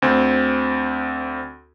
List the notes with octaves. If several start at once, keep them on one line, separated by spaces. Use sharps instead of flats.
D2 C4